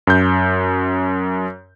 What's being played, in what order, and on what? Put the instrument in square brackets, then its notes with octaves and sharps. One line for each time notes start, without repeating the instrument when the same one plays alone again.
[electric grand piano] F#2 G6